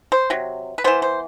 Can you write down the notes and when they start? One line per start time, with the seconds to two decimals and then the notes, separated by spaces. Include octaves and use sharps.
0.12 C5
0.30 C3 F#3
0.78 B4
0.84 E3 B3 C5
1.02 C5